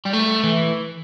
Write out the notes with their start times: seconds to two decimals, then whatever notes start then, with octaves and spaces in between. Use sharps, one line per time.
0.05 G3
0.13 A3
0.44 E3